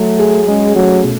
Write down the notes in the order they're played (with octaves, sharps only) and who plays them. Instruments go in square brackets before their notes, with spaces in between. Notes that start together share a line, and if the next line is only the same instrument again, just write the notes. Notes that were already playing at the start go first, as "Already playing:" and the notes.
Already playing: [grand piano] F#3 [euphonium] A3
[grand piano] G#4
[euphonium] G#3 [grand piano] C#4
[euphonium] F#3 [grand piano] A3
[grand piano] B2